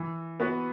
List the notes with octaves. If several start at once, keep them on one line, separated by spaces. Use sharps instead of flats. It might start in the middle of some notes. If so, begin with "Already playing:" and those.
Already playing: E3
B3 F#4 B4